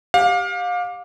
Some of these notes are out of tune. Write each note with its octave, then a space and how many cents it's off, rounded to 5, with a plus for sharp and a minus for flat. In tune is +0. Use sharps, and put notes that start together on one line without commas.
G4 +0 F5 +30